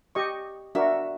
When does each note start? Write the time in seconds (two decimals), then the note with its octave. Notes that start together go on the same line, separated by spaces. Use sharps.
0.15 G4 D#5 C#6
0.75 D4 F#4 A#4 E5